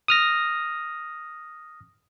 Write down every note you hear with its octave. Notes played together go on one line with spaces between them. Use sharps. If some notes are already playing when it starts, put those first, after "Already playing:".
D#6 F6 A#6